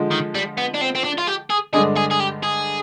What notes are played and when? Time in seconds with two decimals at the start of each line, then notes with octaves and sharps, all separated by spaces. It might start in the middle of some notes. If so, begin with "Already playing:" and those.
Already playing: D3 F3 G#3
0.11 D#3
0.35 G3
0.57 B3
0.74 D4
0.81 C4
0.95 C4
1.04 D4
1.18 F4
1.27 G4
1.50 G#4
1.73 G2 D3 G#3 D4 G#4
1.97 G#4
2.11 G#4
2.20 G4
2.43 G#4